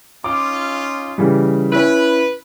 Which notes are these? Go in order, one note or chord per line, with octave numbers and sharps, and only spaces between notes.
C#4 D#4 F4 D6
C#3 E3 G3
C#4 E4 B4